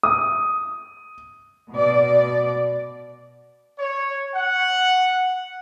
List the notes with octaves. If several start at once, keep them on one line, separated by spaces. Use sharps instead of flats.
D#6
B2 D5
C#5
F#5